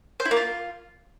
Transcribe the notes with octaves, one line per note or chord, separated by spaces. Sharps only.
C5
E4
A#3
F4